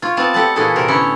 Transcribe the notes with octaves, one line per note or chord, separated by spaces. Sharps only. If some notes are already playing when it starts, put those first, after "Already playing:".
F4 C#5
B3 C4 F4 D5 A5
G4 A4 B4 F#5 A5
A#2 E3 E4 F#4 G#4 A4
C3 G4 A#4 C5
A2 D3 B3 C#4 E4 C#5